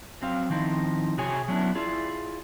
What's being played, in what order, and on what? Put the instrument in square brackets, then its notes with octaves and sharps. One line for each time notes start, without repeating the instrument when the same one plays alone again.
[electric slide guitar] F#3 C4 F5
D#3 F3 C4 D#4 E4
C3 F#4 G#4 C#5 G#5
F#3 B3 C#4 D4 E4
E4 F4 G#4 D5